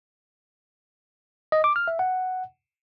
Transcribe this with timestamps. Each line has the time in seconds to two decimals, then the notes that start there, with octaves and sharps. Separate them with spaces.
1.52 D#5
1.64 D6
1.76 F6
1.88 E5
1.99 F#5